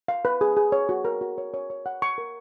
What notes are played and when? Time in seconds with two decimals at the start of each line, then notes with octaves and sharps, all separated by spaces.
0.08 F5
0.25 B4
0.41 G#4
0.57 G#4
0.72 C#5
0.89 F#4
1.05 A#4
1.21 F#4
1.38 C#5
1.54 C#5
1.70 C#5
1.86 F#5
2.02 C#6
2.18 A#4